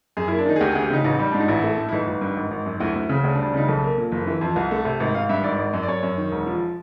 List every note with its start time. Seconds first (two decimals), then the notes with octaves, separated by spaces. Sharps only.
0.17 F#2 G#4
0.28 E4
0.31 A#3
0.38 D4
0.46 D#3 D#4
0.56 G#4
0.61 D2 G4
0.72 G#4
0.75 D2
0.82 G4
0.90 C#3 D#4
1.04 A1 D#4
1.19 G3
1.32 G#2 D4
1.40 D#4
1.48 A1 E4
1.63 A3
1.78 A2
1.89 E4
1.92 G1 D#4
2.07 G1
2.21 G2
2.37 G#1
2.51 G#1
2.66 F#2
2.80 D2 E4
2.95 D2
3.09 C#3
3.24 D2 D4
3.35 D4
3.39 G3
3.46 D4
3.54 C#3 D#4
3.68 B1 A4
3.83 A#3
3.98 A#2
4.12 F#1
4.27 E3
4.41 F2
4.56 C2
4.71 A3
4.85 C3
5.00 G#1
5.15 G#1 F5
5.29 G2 E5
5.44 G#1 D5
5.59 G#1
5.73 F#2
5.83 D5
5.88 F#2 C#5
6.03 F#2
6.17 D#3
6.32 E1
6.46 F3